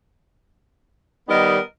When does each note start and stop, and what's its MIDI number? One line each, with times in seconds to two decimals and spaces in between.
1.29 1.58 51
1.29 1.58 55
1.29 1.60 59
1.29 1.60 70
1.29 1.60 75